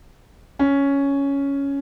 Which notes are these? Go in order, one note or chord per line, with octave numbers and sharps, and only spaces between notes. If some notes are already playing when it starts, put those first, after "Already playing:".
C#4